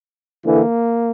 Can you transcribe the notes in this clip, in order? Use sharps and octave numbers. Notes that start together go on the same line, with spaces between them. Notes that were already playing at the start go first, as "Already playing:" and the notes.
D3 E3 A#3